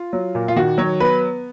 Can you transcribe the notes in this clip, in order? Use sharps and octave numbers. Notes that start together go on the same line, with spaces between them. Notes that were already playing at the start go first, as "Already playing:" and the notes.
Already playing: F4
F#3
A#2
F4
D#3 F#4
F#3 C#5
B3 B4